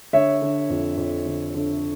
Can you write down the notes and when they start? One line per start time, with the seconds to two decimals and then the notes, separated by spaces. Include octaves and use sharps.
0.13 D3 C#5 E5
0.42 D3
0.70 F2
0.97 F2
1.26 D3
1.54 D3